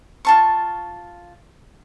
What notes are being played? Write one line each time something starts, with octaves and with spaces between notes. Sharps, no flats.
F4 A5 C#6